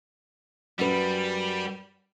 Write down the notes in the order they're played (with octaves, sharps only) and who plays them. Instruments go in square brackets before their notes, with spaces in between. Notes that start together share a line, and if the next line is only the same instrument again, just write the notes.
[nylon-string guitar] F#2 B4 [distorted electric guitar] G3